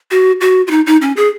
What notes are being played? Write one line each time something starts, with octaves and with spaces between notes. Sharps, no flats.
F#4
F#4
F4
D#4
D#4
C#4
G#4